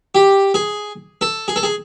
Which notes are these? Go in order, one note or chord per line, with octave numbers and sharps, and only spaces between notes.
G4
G#4
A4
G#4
A4
G#4